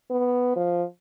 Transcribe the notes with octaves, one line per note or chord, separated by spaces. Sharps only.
B3
F3